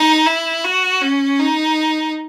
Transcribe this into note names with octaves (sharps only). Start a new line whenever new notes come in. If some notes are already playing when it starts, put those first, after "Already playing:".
Already playing: D#4
E4
F#4
C#4
D#4